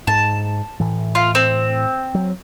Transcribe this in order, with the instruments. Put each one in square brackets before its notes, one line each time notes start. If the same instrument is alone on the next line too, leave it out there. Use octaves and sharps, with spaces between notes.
[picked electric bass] G#2 [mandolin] A5
[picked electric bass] A2 E3
[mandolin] F4
C4
[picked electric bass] F#3